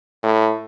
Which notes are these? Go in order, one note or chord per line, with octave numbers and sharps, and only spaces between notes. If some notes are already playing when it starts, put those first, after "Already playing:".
A2